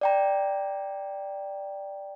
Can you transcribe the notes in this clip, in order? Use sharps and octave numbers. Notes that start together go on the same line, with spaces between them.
D5 G5 A#5